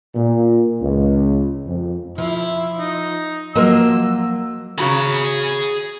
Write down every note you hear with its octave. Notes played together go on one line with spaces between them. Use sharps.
A#2
C#2
F2
F3 E4
D#4
F3 F#3 A#3 A#4 C5 D#5 E6
C#3 F#4 G#4 A#5 B5